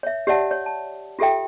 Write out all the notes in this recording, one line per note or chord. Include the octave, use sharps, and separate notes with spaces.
C#5 E5
G4 C#5 D5 E5 F#5 A5
C#5
A5
F4 G4 A4 E5 G5